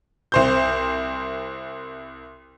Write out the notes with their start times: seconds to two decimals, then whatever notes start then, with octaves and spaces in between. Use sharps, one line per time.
0.32 C2 C5 G6